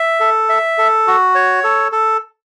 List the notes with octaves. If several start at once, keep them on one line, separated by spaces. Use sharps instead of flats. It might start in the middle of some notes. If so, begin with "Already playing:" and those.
Already playing: E5
A4
E5
A4
F#4
C#5
A4
A4